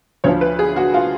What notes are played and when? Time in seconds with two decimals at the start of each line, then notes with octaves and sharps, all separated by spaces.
0.24 D2 D3 F3 C#5
0.41 B4
0.59 G#4
0.76 F#4
0.94 F4